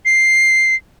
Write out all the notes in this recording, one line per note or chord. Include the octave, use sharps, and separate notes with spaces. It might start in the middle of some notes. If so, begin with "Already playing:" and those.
C7